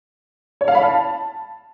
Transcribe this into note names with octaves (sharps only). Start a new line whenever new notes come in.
C#5
F5
B5
A5